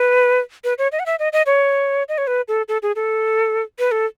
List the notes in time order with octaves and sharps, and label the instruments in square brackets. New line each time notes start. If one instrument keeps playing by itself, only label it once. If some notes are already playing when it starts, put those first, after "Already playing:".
Already playing: [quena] B4
B4
C#5
D#5
F#5
E5
D#5
D#5
C#5
D#5
C#5
B4
A4
A4
G#4
A4
B4
A4